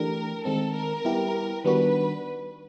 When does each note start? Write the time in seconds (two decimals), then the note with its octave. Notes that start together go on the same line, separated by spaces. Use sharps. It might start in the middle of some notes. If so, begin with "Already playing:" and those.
Already playing: E3 A3 D4 G4 A#4
0.45 D#3 G#3 C4 A4
0.74 A#4
1.05 G3 B3 E4 G4
1.64 D#3 G3 B3 D4 F#4 B4